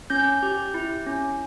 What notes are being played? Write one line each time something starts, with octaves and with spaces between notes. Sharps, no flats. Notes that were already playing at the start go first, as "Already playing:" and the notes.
C#4 G6
G4
E4
C#4